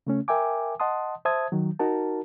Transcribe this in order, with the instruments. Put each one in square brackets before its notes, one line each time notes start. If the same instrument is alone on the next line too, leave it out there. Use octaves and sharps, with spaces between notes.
[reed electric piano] C#3 A3 C#4
A#4 E5 G5 G#5 D6
D#5 F#5 A5 C6 D#6
C5 E5 A5 D#6 G#6
D#3 F#3
D#4 F#4 A#4 A5